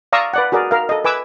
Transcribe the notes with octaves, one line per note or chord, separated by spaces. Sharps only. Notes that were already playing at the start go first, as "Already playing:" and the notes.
D5 F5 A#5 C#6 D#6 E6
B4 D5 F#5
F#4 G#4 A#4 D5
A#4 F5
A4 D#5
B4 G#5 D6 E6